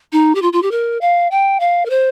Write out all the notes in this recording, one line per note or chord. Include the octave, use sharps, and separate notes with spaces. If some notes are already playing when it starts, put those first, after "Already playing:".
D#4
G4
F4
F4
G4
A#4
F5
G5
F5
A#4
C5